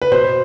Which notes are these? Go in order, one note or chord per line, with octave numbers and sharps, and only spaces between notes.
B4
B2 C5